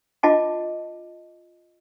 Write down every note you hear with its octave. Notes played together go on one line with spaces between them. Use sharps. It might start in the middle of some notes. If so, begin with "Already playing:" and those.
F4 D#5 A5 D6